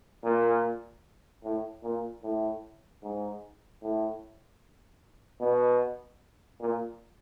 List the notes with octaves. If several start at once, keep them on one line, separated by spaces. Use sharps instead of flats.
A#2
A2
A#2
A2
G#2
A2
B2
A#2